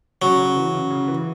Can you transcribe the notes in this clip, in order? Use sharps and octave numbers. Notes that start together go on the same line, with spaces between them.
C#3 F#3
C#3
E3
C#3
C#3
E3